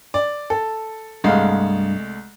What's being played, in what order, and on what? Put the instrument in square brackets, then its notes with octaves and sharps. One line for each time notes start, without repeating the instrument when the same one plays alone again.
[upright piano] D5
A4
[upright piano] C2 G#3 A3 [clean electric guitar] G2 F5